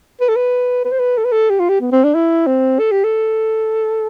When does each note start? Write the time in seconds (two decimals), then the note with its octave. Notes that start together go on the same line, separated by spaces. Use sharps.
0.21 B4
0.29 A4
0.36 B4
0.85 B4
0.92 C5
0.99 B4
1.18 A4
1.25 B4
1.32 A4
1.50 G4
1.59 F4
1.69 G4
1.81 B3
1.92 C4
2.04 D4
2.15 E4
2.47 C4
2.79 A4
2.91 G4
3.04 A4